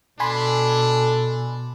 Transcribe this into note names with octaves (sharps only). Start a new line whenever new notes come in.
B2 D4 A4 G#5 B5 C6